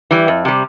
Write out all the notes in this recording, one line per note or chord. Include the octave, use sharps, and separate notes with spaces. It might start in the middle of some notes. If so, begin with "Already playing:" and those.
E3 G3
F2
C3 G3